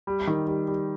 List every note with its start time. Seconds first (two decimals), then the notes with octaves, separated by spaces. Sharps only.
0.07 G3
0.27 D#3
0.47 G3
0.68 G3